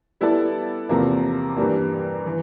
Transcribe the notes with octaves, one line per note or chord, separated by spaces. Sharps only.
G3 B3 E4 A4 D5
E2 C3 F3 A#3
G2 E3 G3 A#3
E3